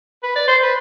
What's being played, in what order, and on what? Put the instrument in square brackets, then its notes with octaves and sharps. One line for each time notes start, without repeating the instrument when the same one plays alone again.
[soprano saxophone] B4
D5
C5
B4